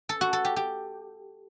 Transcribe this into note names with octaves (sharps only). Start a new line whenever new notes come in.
A4
F#4
A4
G4
G4